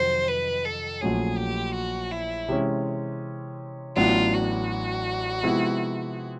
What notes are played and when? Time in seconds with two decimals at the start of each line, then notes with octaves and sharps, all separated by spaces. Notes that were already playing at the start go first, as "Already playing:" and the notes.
Already playing: F2 C3 D#3 F#3 C5
0.28 B4
0.65 A4
1.01 A#1 A#2 F#3 A3 C#4 G#4
1.38 G4
1.75 F#4
2.11 E4
2.48 C3 E3 G#3 C#4
3.96 A1 A2 F#3 B3 D4 F4
4.33 F#4
5.43 C3 F3 G#3 B3 E4